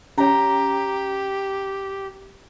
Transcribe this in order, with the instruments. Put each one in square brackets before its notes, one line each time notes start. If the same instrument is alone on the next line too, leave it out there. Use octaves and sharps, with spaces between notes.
[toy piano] C#4 C#5 [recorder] G4 [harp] A#5